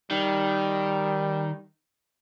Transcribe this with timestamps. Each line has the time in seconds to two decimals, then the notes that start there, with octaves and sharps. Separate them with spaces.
0.11 D#3 G3